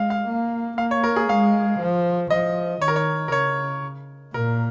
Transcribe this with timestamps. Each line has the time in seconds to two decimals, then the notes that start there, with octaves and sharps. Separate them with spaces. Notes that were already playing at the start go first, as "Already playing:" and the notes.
Already playing: G#3 F5
0.10 F5
0.27 A#3
0.78 A#3 F5
0.91 C#5
1.04 A#4
1.16 G#4
1.29 G#3 F5
1.80 F3
2.30 F3 D#5
2.81 D#3 C#5
2.88 A#4
2.96 C#5
3.28 A#4
3.32 C#3 C#5
4.34 A#2 A#4